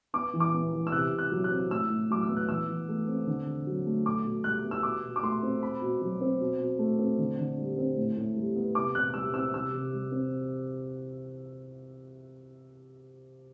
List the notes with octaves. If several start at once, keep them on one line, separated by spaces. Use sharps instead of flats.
B3 D6
E3
D6
B3
E3
E6
C3 F#6
C3
F#6
F#3
F#6
C4
A2 E6
A2
F#3 D6
E6
B3
F#6
E3 E6
E3
A3
C4
D3
D3
F#3
A3
B2 D6
B2
G3 F#6
B3
E6
B2 D6
B2
D6
A3 C6
C4
B2 B5
B2
F#3
C4
B2
B2
A3
C4
D3
D3
G3
C4
A2
A2
G3
B3
C3 D6
C3 F#6
G3 E6
C4 E6
C3 E6
C3
G3
C4